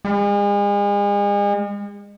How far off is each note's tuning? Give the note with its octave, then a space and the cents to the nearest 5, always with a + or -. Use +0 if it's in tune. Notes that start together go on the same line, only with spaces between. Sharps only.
G#3 -40